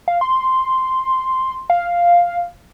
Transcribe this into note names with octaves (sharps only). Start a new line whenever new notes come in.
F5
C6
F5